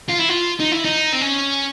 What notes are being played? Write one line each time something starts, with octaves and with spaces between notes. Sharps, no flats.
F4
E4
F4
D#4
E4
D#4
C4
C#4